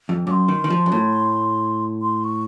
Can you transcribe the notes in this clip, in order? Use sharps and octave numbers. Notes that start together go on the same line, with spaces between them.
F2
F#2 C6 D6
D#3
D#3
F3
F#2
A2
C6
C#6